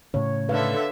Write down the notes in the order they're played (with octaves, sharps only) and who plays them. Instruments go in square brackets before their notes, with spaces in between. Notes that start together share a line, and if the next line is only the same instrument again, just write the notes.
[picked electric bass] A2 C#3 [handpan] C#5
[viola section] D3 A4 E5 [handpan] B4 F5